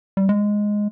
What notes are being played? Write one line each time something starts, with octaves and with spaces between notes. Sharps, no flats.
G3
G#3